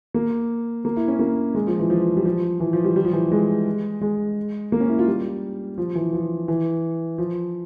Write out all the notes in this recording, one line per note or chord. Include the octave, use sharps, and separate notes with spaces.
A#3
A#3
E4
C#4
A#3
G#3
F3
E3
F3
G3
F3
E3
F3
G3
G3
F3
E3
G#3
G#3
A#3
C#4
E4
F4
G3
F3
E3
F3
E3
F3